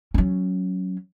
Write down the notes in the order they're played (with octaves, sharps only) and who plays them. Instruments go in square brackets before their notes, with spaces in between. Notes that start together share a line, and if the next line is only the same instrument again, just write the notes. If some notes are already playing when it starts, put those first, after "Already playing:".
[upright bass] F#3 C#4